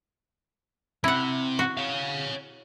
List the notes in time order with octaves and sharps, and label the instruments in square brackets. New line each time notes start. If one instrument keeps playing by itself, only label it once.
[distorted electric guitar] C3 [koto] E4 F#5
[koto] F#4
[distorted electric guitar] C#5 F5